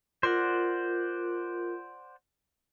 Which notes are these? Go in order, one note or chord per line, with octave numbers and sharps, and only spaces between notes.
F4 A#4 C5 D5 F#5